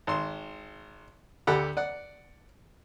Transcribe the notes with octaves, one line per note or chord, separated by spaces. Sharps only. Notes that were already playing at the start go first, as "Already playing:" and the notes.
G#1 C6
D2 G4 A4 D5 F#5 B5
D5 F#5